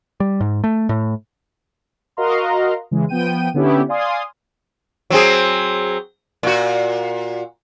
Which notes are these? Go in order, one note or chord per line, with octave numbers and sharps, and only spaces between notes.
G3
G#2
A3
A2
F#4 A#4 D#5 F5 A#5 C6
C#3 E3 G#3
F3 B3 G5 D#7
D3 B3 C#4 E4 G4
D5 F5 G#5 C6 D#6
F#3 C4 G#4
A#2 F#4